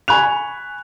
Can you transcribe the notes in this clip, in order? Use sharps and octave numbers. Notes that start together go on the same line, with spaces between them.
G#5 B5 C#6 F#6 F7